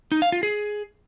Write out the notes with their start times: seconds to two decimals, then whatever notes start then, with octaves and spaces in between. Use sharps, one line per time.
0.12 D#4
0.22 F5
0.32 F4
0.43 G#4